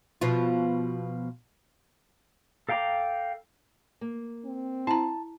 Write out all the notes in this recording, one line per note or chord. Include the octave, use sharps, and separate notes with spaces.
B2 F3 F4
A4 F5 G5 A#5 D6
A#3
C4
E4 A5 A#5